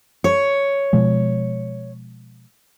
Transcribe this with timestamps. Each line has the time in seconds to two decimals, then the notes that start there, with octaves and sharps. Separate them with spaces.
0.24 C#5
0.93 B2 F3 G#3